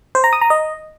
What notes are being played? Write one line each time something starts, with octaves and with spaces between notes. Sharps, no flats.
C5
A#5
D#6
A#5
D#5